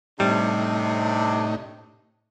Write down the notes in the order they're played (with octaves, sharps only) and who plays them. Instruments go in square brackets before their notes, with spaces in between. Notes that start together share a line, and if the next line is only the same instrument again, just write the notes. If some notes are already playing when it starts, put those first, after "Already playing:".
[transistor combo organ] A2 D#4 [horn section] C3 D4 [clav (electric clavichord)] G3